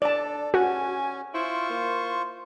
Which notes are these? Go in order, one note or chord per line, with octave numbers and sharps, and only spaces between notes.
D4 A4 D5 A5
C#4 F#4 G#5
E4 F4 C5 C#6
A#3